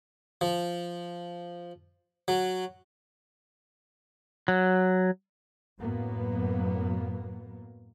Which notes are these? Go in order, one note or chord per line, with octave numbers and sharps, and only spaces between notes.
F3
F#3
F#3
F#2 A2 F#3 A#3 B3